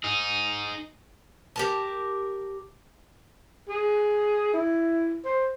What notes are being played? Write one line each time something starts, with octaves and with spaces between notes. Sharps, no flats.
D#4 G#4
G4 A#4 A5
G#4
E4
C5